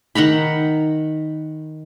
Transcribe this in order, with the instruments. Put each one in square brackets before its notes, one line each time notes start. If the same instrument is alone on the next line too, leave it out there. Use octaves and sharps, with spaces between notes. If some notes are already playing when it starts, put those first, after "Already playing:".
[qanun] D#3 F#5 A#5 B5